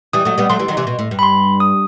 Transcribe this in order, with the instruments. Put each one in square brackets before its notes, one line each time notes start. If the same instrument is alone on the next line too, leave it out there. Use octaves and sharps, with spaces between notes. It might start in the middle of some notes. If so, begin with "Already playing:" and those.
[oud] E3 G3 [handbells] D#6
[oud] F#3 A3
G3 B3
[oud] F#3 A3 [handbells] C6
[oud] E3 G3
D#3 F#3
C3 E3
B2
A2
G2
[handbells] B5
C6
D#6